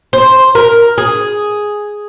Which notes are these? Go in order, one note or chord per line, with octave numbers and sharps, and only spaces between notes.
C5
A#4
G#4